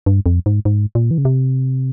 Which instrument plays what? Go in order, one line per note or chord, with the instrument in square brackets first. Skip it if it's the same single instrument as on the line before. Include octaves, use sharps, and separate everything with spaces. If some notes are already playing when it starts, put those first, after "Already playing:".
[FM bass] G2
F2
G#2
G#2
A#2
E3
C#3
C3